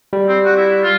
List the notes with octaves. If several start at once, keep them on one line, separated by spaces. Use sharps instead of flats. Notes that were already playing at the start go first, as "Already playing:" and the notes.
G3
C4
F#4
E4
F4